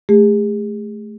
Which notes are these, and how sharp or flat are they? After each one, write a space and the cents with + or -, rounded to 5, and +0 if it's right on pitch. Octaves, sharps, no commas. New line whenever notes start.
A3 -25 G#4 -40